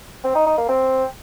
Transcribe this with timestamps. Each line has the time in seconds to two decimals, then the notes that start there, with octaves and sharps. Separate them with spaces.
0.24 C4
0.35 D#4
0.46 D#4
0.57 A#3
0.68 C4